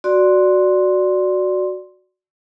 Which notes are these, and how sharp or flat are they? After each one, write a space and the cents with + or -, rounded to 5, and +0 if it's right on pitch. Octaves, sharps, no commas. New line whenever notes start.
F#4 +0 D5 +0 C6 +0